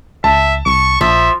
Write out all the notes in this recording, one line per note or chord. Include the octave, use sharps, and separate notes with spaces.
C#2 E5 A5
C2 C#6
A#1 F3 E5